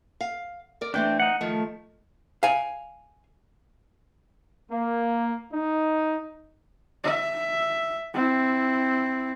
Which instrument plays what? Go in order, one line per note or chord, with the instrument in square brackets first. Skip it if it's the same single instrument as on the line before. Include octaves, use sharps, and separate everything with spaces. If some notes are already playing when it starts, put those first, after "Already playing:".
[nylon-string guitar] F5
A#4 D5
[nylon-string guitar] E3 A3 C4 [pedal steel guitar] D4 G5
[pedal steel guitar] D#4 F#5
[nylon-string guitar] D#3 F3 [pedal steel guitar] A3
[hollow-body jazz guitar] F5 G#5
[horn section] A#3
D#4
[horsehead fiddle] E5
C4 E4